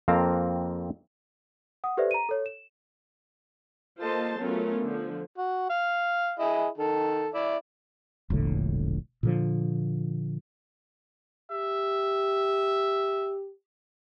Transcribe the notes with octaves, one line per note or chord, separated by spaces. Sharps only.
F2 A#3 C4 F5 A5 A#5
F#5 D#6
G4 A4 B4 C5 D5 E5
A#5 D#7
A4 C#5
E7
A#3 F4 A4 C5 D#5 A5
F#3 A3 B3 C#4 F4 A#4
D3 F3
F#4
F5
E4 G#4 D#5
D#3 A4
E4 D5 E5
E1 A#1 A2 D3
A#2 D3 F3
G4 E5